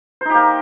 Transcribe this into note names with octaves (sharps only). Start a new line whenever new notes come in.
A#3 D#4 G4 C5